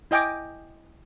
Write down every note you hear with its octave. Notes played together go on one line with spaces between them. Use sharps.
E4 D#5 G5 G#5 D6